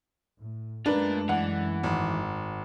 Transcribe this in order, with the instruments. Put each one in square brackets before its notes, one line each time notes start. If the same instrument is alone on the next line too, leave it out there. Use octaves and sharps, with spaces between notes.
[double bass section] A2
[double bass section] F#2 G#3 A3 [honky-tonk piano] D4 [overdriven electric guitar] F4 A#4 [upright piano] B4
[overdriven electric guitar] E3 [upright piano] F#5
[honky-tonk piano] G#1